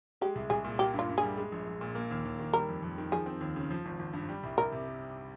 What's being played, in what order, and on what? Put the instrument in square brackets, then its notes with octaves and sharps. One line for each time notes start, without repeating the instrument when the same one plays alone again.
[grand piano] G#3 [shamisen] G4
[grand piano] C2
[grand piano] C2 [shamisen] G#4
[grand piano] A#2
[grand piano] A#3 [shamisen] G4
[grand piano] G2
[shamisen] F4
[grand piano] G2
[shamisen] G#4
[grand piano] G3
G#3
A#1
A#1
A#2
A#3
D#2
D#2
D#3
[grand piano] G3 [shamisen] A#4
[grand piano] F2
F2
D#3
[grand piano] F3 [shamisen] G#4
[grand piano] C4
D#2
C#3
F3
G#1
G#1
G2
G3
C2
[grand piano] C2 [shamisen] A#4
[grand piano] C3